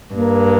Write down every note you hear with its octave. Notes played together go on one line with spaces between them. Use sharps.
G2 A#3